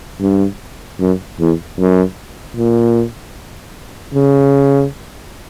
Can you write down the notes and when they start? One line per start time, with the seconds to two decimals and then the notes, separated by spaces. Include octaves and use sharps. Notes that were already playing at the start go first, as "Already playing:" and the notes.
0.21 G2
1.00 F#2
1.40 E2
1.79 F#2
2.56 A#2
4.14 C#3